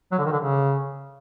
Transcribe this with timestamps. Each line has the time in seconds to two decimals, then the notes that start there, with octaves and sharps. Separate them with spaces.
0.12 F#3
0.18 D3
0.25 D#3
0.32 D3
0.39 C#3